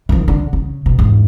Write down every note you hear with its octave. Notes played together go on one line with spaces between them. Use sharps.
D#3 F3
D3
C#3
B2
E2 G#2